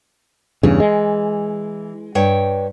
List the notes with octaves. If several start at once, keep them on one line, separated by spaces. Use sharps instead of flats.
E2 G2 C#3 E3
G#3
G2 C#5 G5